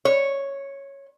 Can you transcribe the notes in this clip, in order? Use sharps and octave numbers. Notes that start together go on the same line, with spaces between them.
C#5